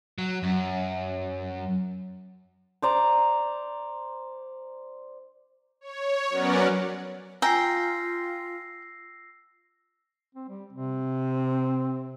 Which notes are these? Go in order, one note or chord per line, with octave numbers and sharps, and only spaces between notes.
F#3
F#2
C5 D5 A#5
C#5
F#3 B3 C#4 A#4 D5 F#5
F4 G5 G#5 A#5 E6 A#6 C7
C4
G3
C3 C4